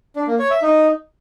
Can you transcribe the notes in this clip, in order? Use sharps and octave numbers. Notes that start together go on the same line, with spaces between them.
D4
A#3
C#5
E5
D#4